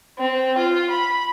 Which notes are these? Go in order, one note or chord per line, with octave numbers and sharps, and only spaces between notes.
C4
F4
B5